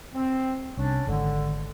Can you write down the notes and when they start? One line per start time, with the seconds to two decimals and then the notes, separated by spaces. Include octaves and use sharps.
0.14 C4
0.78 C2 C#4 D4
1.07 G#1 G#2 D3